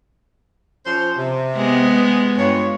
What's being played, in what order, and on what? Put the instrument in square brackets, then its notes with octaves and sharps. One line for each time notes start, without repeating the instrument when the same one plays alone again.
[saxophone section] F3 C#4 C5
C3
[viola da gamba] G#3 B3
[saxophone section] G2 F4 C#5